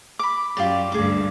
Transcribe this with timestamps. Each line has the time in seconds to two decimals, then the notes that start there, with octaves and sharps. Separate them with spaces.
0.19 B5 D6
0.57 F#2 F4 G4 D5
0.92 D2 G2 G#4 D6